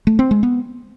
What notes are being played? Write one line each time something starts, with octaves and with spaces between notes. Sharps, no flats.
A3
C4
G#3
B3